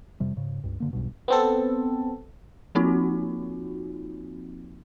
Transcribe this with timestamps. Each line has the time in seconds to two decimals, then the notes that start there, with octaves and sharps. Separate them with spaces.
0.20 F2 C3 G3
0.37 G#2 C#3
0.64 C#2 G2
0.80 G2 D3 A#3
0.93 B1 E2 G2 B2
1.28 B3 C4 A4
2.75 F3 A#3 C4 D#4 F4 F#4